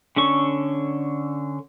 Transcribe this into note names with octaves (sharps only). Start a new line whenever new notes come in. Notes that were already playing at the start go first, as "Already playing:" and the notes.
D3 C#4 A4 C#6